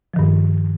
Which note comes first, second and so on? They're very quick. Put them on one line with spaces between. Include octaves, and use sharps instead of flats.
F3 D#3 G2